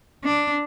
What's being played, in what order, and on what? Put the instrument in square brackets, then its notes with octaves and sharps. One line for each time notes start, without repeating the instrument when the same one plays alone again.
[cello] D4